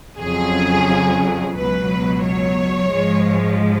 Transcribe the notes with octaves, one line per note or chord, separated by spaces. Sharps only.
F2 C#3 F#3 G#4
C#2 B2 F#3 B4
C#5
G#2 F3 G#3